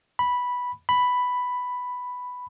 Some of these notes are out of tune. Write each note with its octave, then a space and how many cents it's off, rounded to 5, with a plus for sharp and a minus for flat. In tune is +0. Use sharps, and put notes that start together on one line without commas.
B5 -5
B5 +5